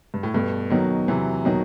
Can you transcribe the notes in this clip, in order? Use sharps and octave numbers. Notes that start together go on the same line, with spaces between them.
G2
A2
G2 B2 A3
B2 D#3 F#3
C3 E3 F#3
B2 D#3 F#3